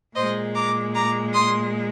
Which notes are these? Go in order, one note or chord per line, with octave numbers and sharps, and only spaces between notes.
A#2 G#3 C5 D#5
A#5 D6
A#5 D6
C6 D#6